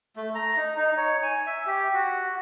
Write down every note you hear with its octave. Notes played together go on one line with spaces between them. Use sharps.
A3
A#5
D#4
D#4
C#5
G#5
E5
G4
F#4